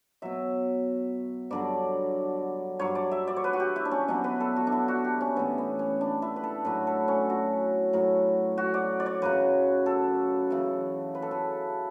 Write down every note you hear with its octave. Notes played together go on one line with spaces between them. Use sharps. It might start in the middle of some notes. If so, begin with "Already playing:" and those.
B2 F#3 E5
G2 D3 F#3 D5
G2 F#3 C#5
D5
E5
D5
C#5
B4
F#4
G4
E4
D4
C#4
B2 F#3 D4
B4
A4
F#4
D4
E4
F#4
G4
C#4
A2 E3 B3
B3
C#4
D4
E4
B4
A4
A2 F#3 B4
A4
C#4
F#4
A2 F#3
F#4
D5
D5
C#5
F#2 C#3 F#3 B4
A4
F#2 C#3 E3
B4
A4
B4